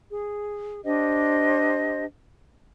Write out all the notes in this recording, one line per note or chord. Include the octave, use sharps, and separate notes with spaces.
G#4
D4 G4 C5 D#5